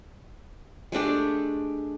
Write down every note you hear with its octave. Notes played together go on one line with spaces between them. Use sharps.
G#3 A3 D4 G4